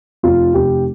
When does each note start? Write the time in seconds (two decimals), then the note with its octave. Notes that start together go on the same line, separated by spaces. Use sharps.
0.23 F1 F4
0.54 F1 G4